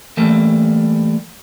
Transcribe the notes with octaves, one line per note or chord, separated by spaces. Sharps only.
E3 G3 A3 A#3